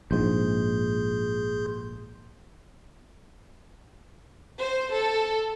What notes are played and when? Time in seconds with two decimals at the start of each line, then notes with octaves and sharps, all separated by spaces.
0.11 A#1 G#2 G#4 C6 G6
4.60 C5
4.93 A4